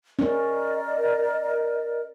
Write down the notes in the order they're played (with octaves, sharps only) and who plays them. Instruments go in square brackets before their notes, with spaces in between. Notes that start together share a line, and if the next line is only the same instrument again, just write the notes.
[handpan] C#4 [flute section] A#4 D5 D#5